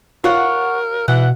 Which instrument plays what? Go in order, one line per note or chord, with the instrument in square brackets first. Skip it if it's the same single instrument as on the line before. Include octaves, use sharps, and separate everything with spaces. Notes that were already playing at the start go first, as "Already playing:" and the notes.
[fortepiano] F4 [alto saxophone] A#4 [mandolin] C#5 F#5
[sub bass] B2 [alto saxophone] E3 [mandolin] F#5